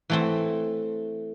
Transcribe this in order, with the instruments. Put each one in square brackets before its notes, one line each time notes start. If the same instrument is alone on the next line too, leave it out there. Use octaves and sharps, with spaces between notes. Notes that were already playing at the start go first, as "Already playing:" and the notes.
[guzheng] E3 A3 C4